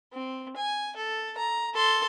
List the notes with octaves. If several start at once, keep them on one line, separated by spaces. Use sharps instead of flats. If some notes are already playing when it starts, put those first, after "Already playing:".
C4
G#5
A4
A#5
A4 C6